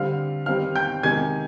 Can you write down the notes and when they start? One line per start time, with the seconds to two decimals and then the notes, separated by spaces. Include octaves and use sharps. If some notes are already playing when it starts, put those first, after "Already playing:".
Already playing: D3 G3 C4 F5 F6
0.46 D#3 G3 C4 F5 F6
0.75 G5 G6
1.03 C3 D#3 G#3 G#5 G#6